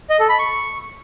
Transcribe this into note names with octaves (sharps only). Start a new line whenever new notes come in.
D#5
A4
B5
C#6